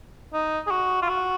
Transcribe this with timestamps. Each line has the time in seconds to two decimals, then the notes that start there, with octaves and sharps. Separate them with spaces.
0.34 D#4
0.67 G#4
0.71 F#4
1.02 F4
1.09 F#4